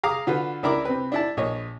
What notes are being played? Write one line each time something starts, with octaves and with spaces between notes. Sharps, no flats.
G#4 F5 A#5 D6 D#6
D3 F4 F#4 B4
C#2 D4 E4 A#4 B5 D6
C3 C4 B4
D4 E4 A5
A#1 C#5 D#5